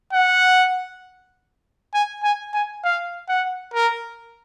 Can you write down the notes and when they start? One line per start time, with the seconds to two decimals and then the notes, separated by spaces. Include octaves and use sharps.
0.13 F#5
1.94 G#5
2.23 G#5
2.54 G#5
2.84 F5
3.29 F#5
3.74 A#4